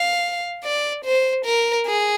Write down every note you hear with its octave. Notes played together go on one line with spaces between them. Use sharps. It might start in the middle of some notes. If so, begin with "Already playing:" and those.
Already playing: F5
D5
C5
A#4
G#4